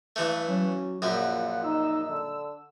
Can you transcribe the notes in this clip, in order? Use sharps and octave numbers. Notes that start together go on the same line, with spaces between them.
G2 E3 A3
F#3 C#4
A#1 F#2 G3 F4 F#5
D#4 E6
D3